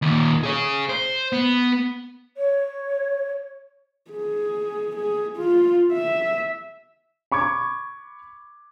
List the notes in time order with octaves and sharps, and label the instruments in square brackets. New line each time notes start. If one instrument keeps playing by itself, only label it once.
[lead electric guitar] D#2 A#2
G#4 C#5
C5
B3
[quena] C#5
[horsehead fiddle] G#4
G#4
F4
E5
[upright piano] B5 C#6 D6 G#6